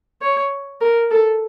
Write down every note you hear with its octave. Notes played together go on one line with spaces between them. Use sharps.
C#5
A#4
A4